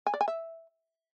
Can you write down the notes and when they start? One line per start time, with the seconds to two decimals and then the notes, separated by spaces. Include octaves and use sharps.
0.06 G#5
0.14 D5
0.21 G#5
0.28 E5